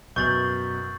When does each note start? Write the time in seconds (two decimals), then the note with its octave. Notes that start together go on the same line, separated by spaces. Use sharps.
0.16 F#2 B2 C#6 G6 A6 F#7